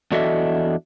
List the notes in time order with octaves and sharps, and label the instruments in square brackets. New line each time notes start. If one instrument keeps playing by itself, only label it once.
[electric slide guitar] E2 D4 F#4 A4 D#5 E5